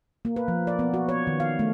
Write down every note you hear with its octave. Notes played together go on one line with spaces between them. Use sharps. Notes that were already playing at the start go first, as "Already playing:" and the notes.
A#3
B4
F3
D5
B3
F#4
C#5
D#3
F5
A3